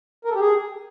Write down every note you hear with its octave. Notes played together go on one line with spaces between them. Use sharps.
A#4
A4
G4
G#4